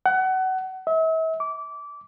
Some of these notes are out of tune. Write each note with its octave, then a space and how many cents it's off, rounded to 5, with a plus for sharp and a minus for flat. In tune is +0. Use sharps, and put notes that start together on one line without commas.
F#5 +25
E5 -40
D6 -20